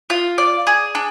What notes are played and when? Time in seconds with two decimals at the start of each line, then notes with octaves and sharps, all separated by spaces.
0.10 F4
0.38 D5
0.67 G#4
0.95 D4